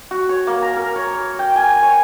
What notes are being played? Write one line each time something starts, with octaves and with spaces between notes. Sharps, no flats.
F#4
C#5
A#3
A#5
A#4
C#5
C#5
G5
G#5
C#5